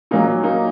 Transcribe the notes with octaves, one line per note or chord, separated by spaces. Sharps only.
A#2 F#3 A#3 D#4
A#3 D#4